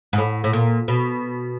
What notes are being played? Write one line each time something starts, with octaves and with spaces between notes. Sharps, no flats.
G#2
A2
A2
A#2
B2